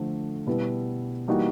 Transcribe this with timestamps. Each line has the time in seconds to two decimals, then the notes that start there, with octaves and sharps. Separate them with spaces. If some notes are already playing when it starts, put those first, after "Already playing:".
Already playing: D3 F3 A3
0.46 B2 G3 B3 E4
1.28 E3 G3 A#3 D#4 F#4